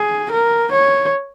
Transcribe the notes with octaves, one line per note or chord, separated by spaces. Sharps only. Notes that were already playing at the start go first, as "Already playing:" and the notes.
Already playing: G#4
A#4
C#5